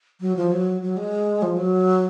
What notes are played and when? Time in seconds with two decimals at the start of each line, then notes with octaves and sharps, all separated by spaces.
0.21 F#3
0.36 F3
0.52 F#3
0.82 F#3
0.97 G#3
1.42 F3
1.57 F#3